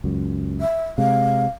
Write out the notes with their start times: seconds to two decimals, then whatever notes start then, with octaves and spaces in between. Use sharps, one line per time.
0.04 C#2 F#2
0.61 E5
0.98 C3 G#3 F5